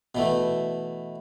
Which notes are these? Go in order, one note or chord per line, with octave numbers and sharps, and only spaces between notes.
B2 E3 A3